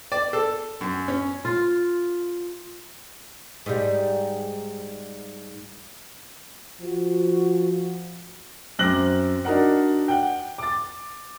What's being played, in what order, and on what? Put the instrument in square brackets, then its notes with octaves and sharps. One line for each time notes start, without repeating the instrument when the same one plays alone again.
[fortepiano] D5
A4
F#2
C#4
[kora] F4
[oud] G#2 G3
[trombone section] F3 F#4
[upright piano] F#2 C4 D6 F#6 A#6 F#7
D4 D#4 F#4 A#4 F#5
F#5 G5
D6 A6